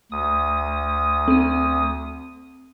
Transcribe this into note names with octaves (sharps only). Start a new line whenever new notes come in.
D2 D#6
C4 D#7